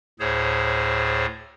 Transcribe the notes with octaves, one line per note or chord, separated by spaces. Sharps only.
D2 A2 G#4 C5 C#5